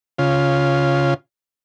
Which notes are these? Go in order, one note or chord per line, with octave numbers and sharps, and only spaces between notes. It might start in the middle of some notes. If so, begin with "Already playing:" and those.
C#3 F4